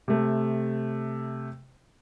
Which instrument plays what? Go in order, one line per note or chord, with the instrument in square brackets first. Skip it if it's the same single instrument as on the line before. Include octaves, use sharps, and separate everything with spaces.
[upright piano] C3 A3